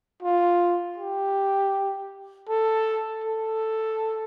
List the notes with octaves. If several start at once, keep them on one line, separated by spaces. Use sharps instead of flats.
F4
G4
A4
A4